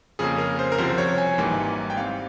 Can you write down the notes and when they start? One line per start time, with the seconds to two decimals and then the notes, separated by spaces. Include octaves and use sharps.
0.19 F2 C#3 F3 A#3 C#4 G#4
0.38 A#4
0.59 C5
0.72 A#4
0.78 C2 C3 F3 C5
0.98 C#5
1.18 G#5
1.38 G#1 G#2 E3 G3 A#3 G#5
1.90 G5
1.97 G#2 G3 C4 F5